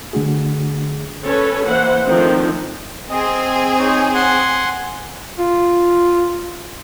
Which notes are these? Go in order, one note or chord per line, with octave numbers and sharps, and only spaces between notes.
D3 A3 D4 F#4 G#4
C#4 A4 B4 C#5
E3 A#3 E4 C5 F#5
D#3 F3 A3 C4 D4 D#4
C4 G#4 D#5
D#4 C#5
F#5 G#5 C6
F4